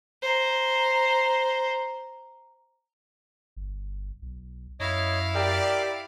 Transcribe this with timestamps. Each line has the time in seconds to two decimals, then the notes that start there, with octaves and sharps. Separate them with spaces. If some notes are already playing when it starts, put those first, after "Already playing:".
0.22 C5 A#5
3.56 G1
4.22 B1
4.80 F#2 E4 C#5 D#5 F5
5.35 G4 A#4 D5 G5